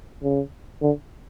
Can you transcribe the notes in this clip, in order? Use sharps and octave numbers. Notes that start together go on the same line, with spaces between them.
C#3
D3